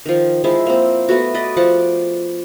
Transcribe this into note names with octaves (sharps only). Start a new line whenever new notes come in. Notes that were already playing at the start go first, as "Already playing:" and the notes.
D#3 F3
F3 G#3 E4
A#3 C4
A3 B3 F#4
B4 D5 D#5
F3 D5 F#5 C#6